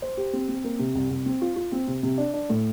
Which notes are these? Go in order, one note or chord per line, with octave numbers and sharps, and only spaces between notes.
C5
G4
C4
C4
A#3
C3
C2
C2
C4
F4
F4
C4
C3
C3
D4
D4
A2